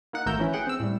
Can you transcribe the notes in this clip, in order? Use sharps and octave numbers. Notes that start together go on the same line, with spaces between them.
A#3 D#4 F#5
G#1 A3 A#4 A#5 E6 G6
E3 C#4 E4
G#4 F#5 G5
C4 E6
A2 G3